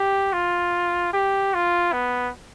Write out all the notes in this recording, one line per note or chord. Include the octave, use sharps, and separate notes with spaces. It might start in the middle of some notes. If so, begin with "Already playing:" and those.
Already playing: G4
F4
G4
F4
B3